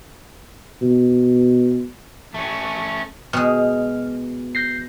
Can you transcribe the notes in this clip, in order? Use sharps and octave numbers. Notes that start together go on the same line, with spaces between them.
B2
A3 C#4
B2 G#3 F6
G6 A#6 C7